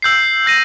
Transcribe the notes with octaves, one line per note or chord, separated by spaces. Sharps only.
E6 G6 C7
G6 A#6 D#7